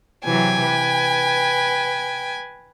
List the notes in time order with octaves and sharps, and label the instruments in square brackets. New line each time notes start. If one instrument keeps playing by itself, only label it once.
[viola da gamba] C3 E3 F#3 [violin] G5 G#5
[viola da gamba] B4